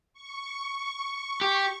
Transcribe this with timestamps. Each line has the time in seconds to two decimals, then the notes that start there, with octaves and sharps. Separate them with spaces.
0.14 C#6
1.41 G4